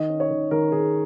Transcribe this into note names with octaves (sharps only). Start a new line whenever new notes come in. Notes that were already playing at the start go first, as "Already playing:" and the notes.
Already playing: D#3 D#5
C#4
C#5
D#3
D#3 A#4
D#3 G#4